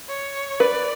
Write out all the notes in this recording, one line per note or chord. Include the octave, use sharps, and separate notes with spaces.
C#5
B4 D5